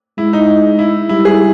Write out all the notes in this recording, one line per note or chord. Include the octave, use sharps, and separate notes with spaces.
G#3 E4
D#4
E4
G3 E4
E4 G#4